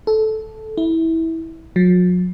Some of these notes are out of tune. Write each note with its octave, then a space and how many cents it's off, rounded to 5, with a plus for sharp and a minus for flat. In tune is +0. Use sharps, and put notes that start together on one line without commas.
A4 -10
E4 -20
F#3 -45